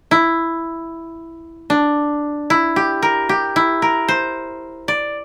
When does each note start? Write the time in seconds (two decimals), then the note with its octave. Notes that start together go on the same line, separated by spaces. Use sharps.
0.11 E4
1.70 D4
2.50 E4
2.76 G4
3.02 A#4
3.29 G4
3.56 E4
3.82 A#4
4.08 C5
4.88 D5